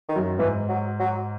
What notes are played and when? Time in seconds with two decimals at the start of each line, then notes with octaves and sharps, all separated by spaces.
0.09 D#3
0.16 F#2
0.38 G#2 E3
0.69 F#3
0.99 F#3